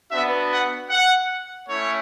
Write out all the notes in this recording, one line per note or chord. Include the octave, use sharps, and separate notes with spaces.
B3 D4 F#4 E5
F#5
F#5
A3 C#4 E4 C#5